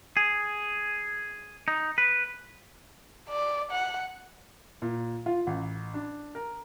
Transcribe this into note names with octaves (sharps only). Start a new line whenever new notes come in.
G#4
D#4
B4
D5
F#5
A#2
F4
A1
D4
A#4